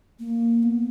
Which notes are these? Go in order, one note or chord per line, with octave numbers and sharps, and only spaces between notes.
A#3
B3